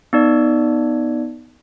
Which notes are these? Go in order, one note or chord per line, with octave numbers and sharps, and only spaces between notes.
B3 D#4 D5